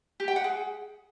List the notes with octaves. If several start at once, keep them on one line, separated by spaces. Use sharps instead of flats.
G4
G5
F#5
G#4